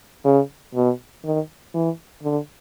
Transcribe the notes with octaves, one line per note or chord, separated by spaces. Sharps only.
C#3
B2
D#3
E3
D3